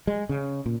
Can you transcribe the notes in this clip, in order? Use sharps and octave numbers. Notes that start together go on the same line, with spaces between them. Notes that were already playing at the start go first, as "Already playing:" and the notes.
G#3
C#3
A#2